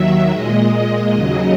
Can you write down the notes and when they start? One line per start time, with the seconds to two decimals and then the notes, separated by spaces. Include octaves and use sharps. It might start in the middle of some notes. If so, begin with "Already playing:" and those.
Already playing: D#2 D#3 F#3 E5
0.30 A#2 G#3 D#5
1.14 D#2 C#3 F#3